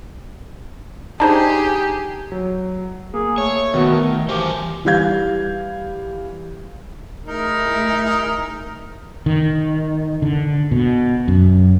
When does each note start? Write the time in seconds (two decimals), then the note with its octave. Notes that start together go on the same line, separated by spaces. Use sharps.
1.20 D4 D#4 G4 G#4 C5
2.32 F#3
3.14 A#3 G#4
3.38 A3 C#5
3.74 B2 D#3 B3 F#4
3.92 A#4
4.29 E3 G4 C5 D6
4.85 E3 G3 F5 G6 G#6
7.26 A3 D#4 E4 G#4 A#4
9.26 D#3
10.22 D3
10.71 B2
11.28 F#2